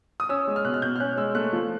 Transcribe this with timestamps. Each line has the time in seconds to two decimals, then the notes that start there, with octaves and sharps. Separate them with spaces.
0.20 D#6
0.29 C#4 E6
0.47 G#3
0.56 F6
0.65 B2 F#6
0.74 F6
0.82 B2 G6
0.96 F6
1.00 C#4 F#6
1.17 G#3 E6
1.35 A3 F#6
1.53 F3